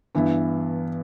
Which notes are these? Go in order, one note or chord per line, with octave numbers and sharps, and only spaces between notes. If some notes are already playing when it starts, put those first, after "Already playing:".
G2 E3 B3 E4